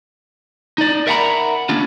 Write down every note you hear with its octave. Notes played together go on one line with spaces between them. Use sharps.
D#4 D5
A#4 E5 F#5 G#5 A#5 B5
A#3 C#4 D4 F4